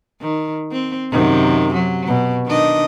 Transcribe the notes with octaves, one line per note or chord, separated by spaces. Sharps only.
D#3
C4
F#2 C3 D#3
F#3
B2
D#3 D4 D#5